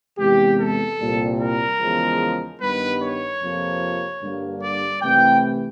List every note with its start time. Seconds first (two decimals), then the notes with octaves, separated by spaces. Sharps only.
0.18 E2 C3 E3 G#3 G4
0.58 A4
0.98 C2 A#2 G3
1.39 A#4
1.79 E2 C#3 F3 G#3
2.60 G2 D#3 G3 B3 B4
3.00 C#5
3.40 F2 C3 F3 A#3
4.21 G2 D3 G3 A#3
4.62 D5
5.02 C2 C3 E3 A3 G5